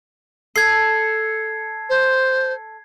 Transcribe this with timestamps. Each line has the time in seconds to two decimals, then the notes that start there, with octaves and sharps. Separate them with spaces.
0.56 A4 G#6 C7
1.89 C5